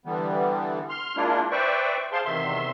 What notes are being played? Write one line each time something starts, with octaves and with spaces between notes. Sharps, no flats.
D3 E3 G3 B3
C6 F6
G#3 A#3 D4 E4 F4
B4 C5 D5 E5 G5 C#6
G#4 C5 F5 A5 C6
E2 C3 D#3 E5 C6